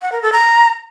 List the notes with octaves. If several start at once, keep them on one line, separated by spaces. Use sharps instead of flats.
F#5
A#4
A4
A#5